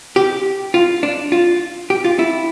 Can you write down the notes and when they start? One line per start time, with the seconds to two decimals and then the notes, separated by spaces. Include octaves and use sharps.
0.16 G4
0.74 F4
1.03 D4
1.32 F4
1.90 G4
2.05 F4
2.19 E4